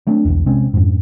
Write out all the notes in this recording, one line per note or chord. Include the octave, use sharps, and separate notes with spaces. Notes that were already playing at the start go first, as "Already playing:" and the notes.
F#3 A3 C4 D4
B1 E2
C3 G#3 C4 C#4
F2 G#2